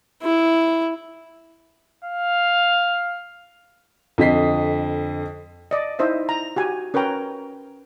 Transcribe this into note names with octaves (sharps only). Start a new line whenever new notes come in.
E4
F5
F2 D3 D#5 B6 C7
D5 D#5
D#4 E4 C5 D#5 E5
A#5
F#4 G4 G#5
C#4 A#4 B4 C#5 G5 A#5